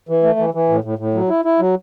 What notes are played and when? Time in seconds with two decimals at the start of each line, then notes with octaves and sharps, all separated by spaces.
0.09 E3
0.23 A3
0.39 E3
0.54 E3
0.69 A2
0.84 A2
0.99 A2
1.14 F#3
1.29 E4
1.45 E4
1.60 F#3